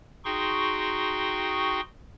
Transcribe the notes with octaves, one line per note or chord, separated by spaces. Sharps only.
D#4 F#4 G#4 G5 C6 C#6